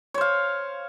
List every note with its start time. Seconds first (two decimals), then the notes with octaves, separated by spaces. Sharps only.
0.14 C#5
0.18 C5
0.21 F5